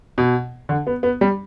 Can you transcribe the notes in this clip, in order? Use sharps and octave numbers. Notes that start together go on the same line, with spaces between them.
B2
D3
B3
B3
G3